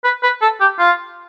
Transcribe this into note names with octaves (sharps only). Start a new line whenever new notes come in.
B4
B4
A4
G4
F4